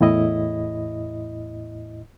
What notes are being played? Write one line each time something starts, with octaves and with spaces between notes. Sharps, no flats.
E2 A2 E4 D#5